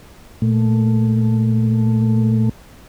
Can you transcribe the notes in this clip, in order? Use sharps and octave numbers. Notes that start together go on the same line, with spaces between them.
A#2 A3